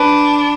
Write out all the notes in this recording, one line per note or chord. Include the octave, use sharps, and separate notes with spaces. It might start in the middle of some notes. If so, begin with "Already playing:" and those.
Already playing: D4 B4